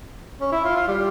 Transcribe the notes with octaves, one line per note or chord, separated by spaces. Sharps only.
C#4
E4
F4
F4
G3